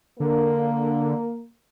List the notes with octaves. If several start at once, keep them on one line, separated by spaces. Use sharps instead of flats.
D3 A#3